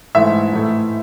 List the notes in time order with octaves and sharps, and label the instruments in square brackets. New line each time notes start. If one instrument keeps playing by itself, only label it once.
[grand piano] G#2 E3 A3 E5
A2 E3 A3